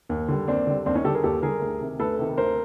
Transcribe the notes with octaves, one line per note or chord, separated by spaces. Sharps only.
D#2
D3 G3
D#2 C4 D4
D3 G3
D#2 C4 D4
C#4 D#4
D3 G3 G4 A4
G#4 A#4
D#2 G4 A4
D3 G3 G#4 A#4
D2
C3 D#3
D2 A4 B4
C3 D#3
D2 A#4 C5